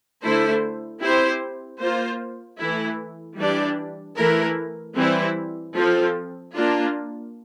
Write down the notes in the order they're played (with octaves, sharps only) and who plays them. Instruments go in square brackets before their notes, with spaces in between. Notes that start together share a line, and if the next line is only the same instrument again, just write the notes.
[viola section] D3 A3 E4 A4 C5
C4 E4 G4 C5
A#3 F4 C5
E3 A3 E4
E3 G3 D4 G4 D5
E3 A3 E4 A#4
E3 G3 C4 E4
F3 C4 F4 A4
A#3 D4 F4